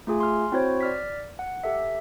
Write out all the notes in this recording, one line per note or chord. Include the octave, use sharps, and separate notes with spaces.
A3 F4 G#4 G#5
C6 F6
C4 E4 F#4 C5 C#5
D5 F6 B6
F#5
G4 A4 E5